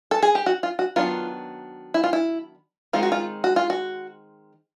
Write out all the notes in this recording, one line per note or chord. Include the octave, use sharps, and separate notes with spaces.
A4
G#4
G4
F#4
F4
F#4
D#3 F#3 B3 D4 F4
E4
F4
E4
D#3 G#3 C4 D#4 F4
F#4
F4
F#4
F4
F#4